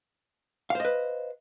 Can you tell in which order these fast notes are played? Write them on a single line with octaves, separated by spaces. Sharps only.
F5 C5 D#5 B4